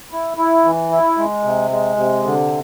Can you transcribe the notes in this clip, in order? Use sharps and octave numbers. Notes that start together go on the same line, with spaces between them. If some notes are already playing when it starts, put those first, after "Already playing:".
E4
E4
E3
E4
G#3
C3
G#3
C3
D3